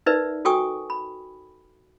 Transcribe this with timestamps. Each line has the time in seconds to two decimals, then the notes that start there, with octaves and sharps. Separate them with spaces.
0.06 D#4 A#4 B4 D5 E5
0.45 F#4 A4 G5 G#5 C#6 D#6
0.90 B5